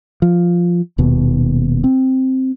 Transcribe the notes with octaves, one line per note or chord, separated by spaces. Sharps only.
F3
D#1 D#2 B2
C4